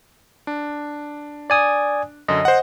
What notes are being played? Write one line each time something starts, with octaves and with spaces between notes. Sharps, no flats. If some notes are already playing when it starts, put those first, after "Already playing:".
D4
D5 G#5 D#6
F#2 D3 D#5
C5 F#5